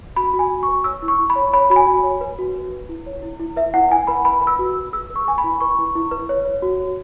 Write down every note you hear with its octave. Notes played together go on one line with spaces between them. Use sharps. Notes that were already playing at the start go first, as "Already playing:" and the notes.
F#4 B5
F#4
G#5
F#4
C#6
B4
C#5 E6
E4
C#6
E4
B5
C#5
C#5 B5
F#4 B5
G#5
F#4
C#5
B4
F#4
B4
B4
E4
C#5
E4
E4
B4 E5
E4 F#5
E4 G#5
B4 B5
B4 B5
B4
E6
F#4
B4
G#4 E6
B4
C#6
B4 G#5
B5
E4
B4 C#6
E4
E4
B4
C#5
C#5
F#4
C#5